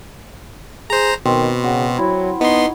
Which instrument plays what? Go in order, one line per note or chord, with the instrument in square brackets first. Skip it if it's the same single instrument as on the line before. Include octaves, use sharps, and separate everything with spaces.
[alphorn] G#4 [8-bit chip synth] C5 A#5
[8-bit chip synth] B2 [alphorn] D#3 [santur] C4
[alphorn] C#3 [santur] F#4
[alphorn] F#3 [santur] E4
[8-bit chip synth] B3 C6 [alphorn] D#4 [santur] C#6